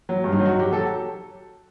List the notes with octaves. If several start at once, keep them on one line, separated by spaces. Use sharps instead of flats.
F#3
G2
D#4
F#3
F#4
F#3 G4
F#3 A4